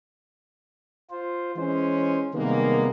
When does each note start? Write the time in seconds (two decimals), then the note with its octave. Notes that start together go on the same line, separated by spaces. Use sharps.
1.10 F4 C5
1.56 E3 G#3 C#4 C5
2.34 C3 D#3 G3 G#3 A#3 B3